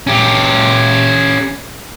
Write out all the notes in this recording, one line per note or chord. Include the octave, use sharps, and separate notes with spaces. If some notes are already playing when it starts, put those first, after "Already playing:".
C#4 G4